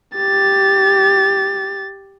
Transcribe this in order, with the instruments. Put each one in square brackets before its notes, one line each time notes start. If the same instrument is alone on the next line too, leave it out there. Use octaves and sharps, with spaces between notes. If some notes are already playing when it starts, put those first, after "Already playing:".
[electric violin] G4 A6